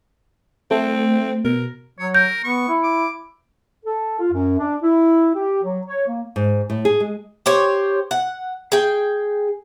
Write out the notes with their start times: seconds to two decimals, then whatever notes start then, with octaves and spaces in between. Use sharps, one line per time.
0.71 A3 C4
1.45 B2 A#4
1.99 F#3 C#5
2.15 A#4 G6
2.44 B3 C#6
2.68 E4
2.83 D6
3.85 A4
4.19 F4
4.32 F#2
4.58 D4
4.82 E4
5.35 G4
5.63 F#3
5.86 C#5
6.08 A#3
6.36 G#2
6.70 A2
6.85 G#4
7.00 G#3
7.46 G4 C5 C#5
8.11 F#5
8.72 G#4 G5